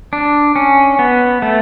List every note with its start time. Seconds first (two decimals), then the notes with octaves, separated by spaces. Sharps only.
0.13 D4
0.56 C#4
0.99 B3
1.42 A3